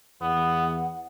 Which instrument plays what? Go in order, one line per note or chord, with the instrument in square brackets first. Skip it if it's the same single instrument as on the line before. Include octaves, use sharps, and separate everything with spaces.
[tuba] E2 [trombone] B3 [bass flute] F#5